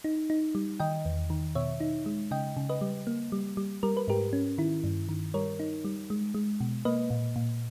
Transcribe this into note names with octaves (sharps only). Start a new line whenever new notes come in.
D#4
D#4
G3
D#3 D#5 G5
E2
D#3
B2 C#5 E5
D#4
G#3
C#3 D#5 G5
C#3
B4 D#5
G3
A#3
G3
G3
G3 A#4
B4
G#2 G4 A#4
C#4
D#3 E4
G2
D#3
G3 A#4 C#5
D#4
G3
G#3
G#3
B2
A#3 B4 D#5
A#2
A#2